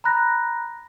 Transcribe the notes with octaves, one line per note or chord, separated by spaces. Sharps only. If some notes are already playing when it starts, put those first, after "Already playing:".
A#5 B5 F#6 A#6